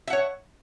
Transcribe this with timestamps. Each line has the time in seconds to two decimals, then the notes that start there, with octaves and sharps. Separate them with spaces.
0.07 E5
0.10 F#5
0.13 C#5